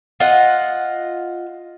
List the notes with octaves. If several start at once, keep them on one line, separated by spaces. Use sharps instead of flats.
F4 D#5 F#5